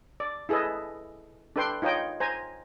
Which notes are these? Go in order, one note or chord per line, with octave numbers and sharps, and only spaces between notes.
D5
E4 G#4 A4 B4 D#5
D4 A4 B4 G5 C6
D#4 F4 C#5 D#5 G5
C5 G#5 A#5